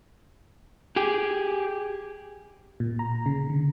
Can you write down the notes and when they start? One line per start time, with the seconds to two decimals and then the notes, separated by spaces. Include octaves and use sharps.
0.96 G4 G#4
2.80 A#2
2.99 A#5
3.26 C#3
3.50 D3